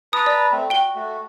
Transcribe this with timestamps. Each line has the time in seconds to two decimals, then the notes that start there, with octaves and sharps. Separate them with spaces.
0.13 B4 A5 A#5 D#6
0.26 D5
0.52 A3 C4
0.70 F#4 G5 G7
0.95 A3 F#4